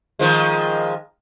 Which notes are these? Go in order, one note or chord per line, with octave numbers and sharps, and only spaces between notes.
D#3 F3 G#3